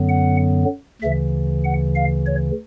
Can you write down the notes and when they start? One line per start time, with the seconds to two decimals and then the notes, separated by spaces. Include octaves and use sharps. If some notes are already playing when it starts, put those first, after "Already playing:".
Already playing: F#2 D3 F#3 B3
0.09 F#5
1.02 D2 C#3 E3 E5
1.64 F#5
1.96 F5
2.26 C#5